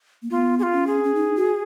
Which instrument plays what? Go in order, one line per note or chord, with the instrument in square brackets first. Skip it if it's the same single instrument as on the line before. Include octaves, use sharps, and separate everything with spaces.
[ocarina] A#3
[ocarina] B3 [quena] F4
[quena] G#4
F4
[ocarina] C#4
[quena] G#4
[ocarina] C#4
D#4
F#4